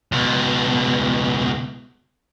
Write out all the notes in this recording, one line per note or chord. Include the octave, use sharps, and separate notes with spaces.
C#2 B2